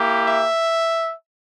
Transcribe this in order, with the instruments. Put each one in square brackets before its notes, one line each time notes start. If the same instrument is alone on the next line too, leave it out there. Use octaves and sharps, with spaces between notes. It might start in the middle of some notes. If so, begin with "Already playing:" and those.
Already playing: [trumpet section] A#3 E4 G4
E5